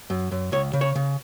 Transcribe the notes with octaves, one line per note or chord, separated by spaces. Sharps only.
F#2
F#2
C#2 C#5
C#3
C#5
C#3